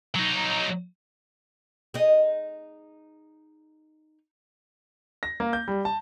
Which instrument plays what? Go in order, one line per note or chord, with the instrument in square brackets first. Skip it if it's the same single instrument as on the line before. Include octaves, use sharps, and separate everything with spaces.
[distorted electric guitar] F#3 D#4
[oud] D#4 G#4
[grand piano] A#6
A#3
G6
G3
A5